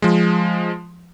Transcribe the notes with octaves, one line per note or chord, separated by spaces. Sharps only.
F3 G#3